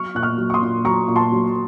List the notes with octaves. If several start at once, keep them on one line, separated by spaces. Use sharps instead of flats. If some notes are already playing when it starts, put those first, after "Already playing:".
Already playing: F#3 C#6 F6
A#2 F#6
C#6 F6
F#3
C#6
C6 D#6
A#2
F#3 A#5 C#6
A#2
A5 C6
F#3